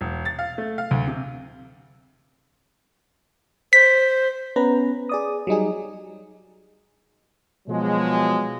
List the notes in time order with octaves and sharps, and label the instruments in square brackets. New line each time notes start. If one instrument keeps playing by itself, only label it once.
[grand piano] E1
A6
F5
A3
F5
D2
C3
[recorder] C5 [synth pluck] B6
[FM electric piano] B3 C#4 B4 A#5
G#4 D5 D#6
F#3 G3 D#4 G#4
[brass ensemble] B2 F3 F#3 G#3